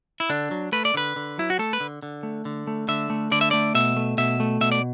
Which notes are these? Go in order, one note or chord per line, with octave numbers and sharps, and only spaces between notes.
E4
D3 D4
F#3
A3 B4
D5
D3 B4
D3
F#3 E4
F#4
A3 A4
B4
D3
D3
A3
D3
A3
D3 E5
A3
D3 D5
E5
A3 D5
B2 E5
A3
B2 E5
A3
B2 E5
D5